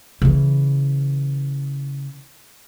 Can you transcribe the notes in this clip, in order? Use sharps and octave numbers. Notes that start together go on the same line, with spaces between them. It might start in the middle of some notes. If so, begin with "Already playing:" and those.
C#3 E3